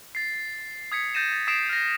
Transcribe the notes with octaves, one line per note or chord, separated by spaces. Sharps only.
A6 C7
D#6 G#6 B6 C#7
G6 A6 A#6 D#7 E7
A6
D#6 G#6 B6 C7 D7 E7
F6 A#6